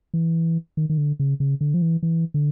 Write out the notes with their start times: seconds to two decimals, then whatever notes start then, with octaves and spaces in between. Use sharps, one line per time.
0.14 E3
0.77 D#3
0.90 D#3
0.98 D3
1.19 C#3
1.40 C#3
1.61 D3
1.74 F3
1.82 E3
2.03 E3
2.34 D3